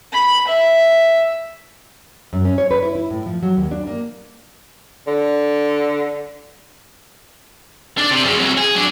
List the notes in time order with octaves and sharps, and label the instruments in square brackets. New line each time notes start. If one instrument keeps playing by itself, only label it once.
[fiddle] B5
E5
[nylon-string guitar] F#2
C#4
C#5
B4
E4
E4
A2
F3
F#3
D#2
D4
A#3
[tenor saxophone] D3
[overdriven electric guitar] D4 D5
C3
F#2 C#3
C2 F#3
G#4
F#3 D4